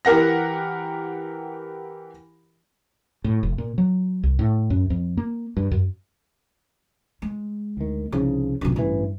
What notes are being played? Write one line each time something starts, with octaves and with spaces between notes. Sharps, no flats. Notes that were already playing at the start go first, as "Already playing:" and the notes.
E3 G4 A#4 F#5 A#6
A2
F1
A#2
F#3
C2
A2
F#2
F2
A#3
G2
F#2
G#3
D2 D#3
C2 C#3 F3 D#4
B1 F#2 A#2 D3
A1 G2 E3